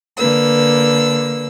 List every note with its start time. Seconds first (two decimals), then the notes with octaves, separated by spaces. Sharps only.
0.16 D3 A#3 B4 E6